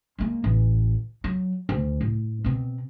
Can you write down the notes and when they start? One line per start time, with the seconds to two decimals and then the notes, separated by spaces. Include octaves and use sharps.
0.19 G#3 A#3
0.44 A1 E3
1.24 F#3
1.69 D2
2.01 A2
2.44 B2 C4